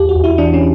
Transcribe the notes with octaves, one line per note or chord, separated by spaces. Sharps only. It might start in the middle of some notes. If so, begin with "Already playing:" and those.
Already playing: E2 G4
F#4
E2
E4
E3 D4
C#4